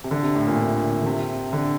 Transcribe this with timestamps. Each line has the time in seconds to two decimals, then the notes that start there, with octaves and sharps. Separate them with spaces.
0.04 C3
0.11 D3
0.23 C3
0.36 A2
0.47 A#2
0.59 D3
1.01 D3
1.06 C3
1.53 D3